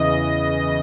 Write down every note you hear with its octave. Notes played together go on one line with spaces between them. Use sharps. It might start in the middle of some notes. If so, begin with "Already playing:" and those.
Already playing: E2 C#3 E3 D#5